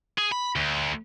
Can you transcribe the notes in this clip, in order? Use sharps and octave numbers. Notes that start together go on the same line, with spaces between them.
G#4
B5
D2